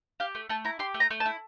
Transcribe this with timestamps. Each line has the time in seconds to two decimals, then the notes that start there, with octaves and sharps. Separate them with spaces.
0.20 G4 F5
0.35 A3
0.49 A3 A5
0.65 E4 A#5
0.79 G4 C6
0.94 A3
1.00 A#5
1.11 A3
1.20 A5
1.26 E4